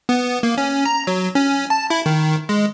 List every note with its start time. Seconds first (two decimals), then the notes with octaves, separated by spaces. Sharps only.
0.09 B3
0.43 A#3
0.58 C#4
0.85 A#5
1.07 F#3
1.35 C#4
1.70 A5
1.90 E4
2.06 D#3
2.49 G#3